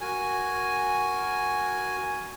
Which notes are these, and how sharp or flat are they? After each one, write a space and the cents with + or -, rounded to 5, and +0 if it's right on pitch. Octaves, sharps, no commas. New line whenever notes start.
F#4 +0 A#4 +0 G#5 +0